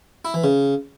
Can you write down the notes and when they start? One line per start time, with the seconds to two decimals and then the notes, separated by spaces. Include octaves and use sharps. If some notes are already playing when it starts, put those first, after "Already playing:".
0.25 E4
0.34 E3
0.44 C#3